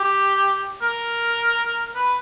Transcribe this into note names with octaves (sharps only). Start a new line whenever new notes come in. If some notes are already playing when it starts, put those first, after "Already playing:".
Already playing: G4
A#4
B4